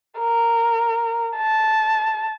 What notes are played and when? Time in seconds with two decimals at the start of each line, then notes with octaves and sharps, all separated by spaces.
0.19 A#4
1.37 A5